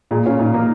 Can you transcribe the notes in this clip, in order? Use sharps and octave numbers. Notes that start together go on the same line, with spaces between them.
A#2 G#4
C#4 F4
A#2 D#4
A#3 D#4